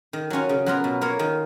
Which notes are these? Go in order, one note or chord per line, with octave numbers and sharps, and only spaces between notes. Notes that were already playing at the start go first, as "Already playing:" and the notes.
D#3
F#3 C#4 F4
C#3
F#3 B3 F4 A#4
B2
A#3 F4 A#4 C#5
D#3